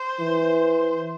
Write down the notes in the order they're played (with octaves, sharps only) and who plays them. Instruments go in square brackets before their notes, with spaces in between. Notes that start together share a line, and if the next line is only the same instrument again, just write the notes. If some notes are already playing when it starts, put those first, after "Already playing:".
Already playing: [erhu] C5
[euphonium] E3